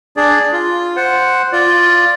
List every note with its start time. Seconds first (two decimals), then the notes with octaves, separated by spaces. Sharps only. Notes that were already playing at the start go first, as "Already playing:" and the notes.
0.17 D4 G#4 D5
0.53 F4
0.96 C5 F#5
1.53 F4 D5